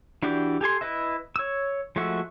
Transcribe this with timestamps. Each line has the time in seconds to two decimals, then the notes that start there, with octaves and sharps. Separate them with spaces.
0.23 E3 D4 F#4 G4 D5
0.61 G4 A4 G#5 C6
0.81 E4 B4 D#5 E5
1.36 C#5 E6
1.96 F3 G#3 A3 F#4 E5